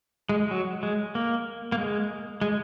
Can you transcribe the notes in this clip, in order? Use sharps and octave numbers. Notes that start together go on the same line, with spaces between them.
G#3
F#3
G#3
A#3
A#3
G#3
G#3